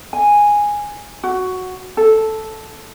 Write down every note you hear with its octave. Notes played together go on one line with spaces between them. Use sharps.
G#5
F#4
A4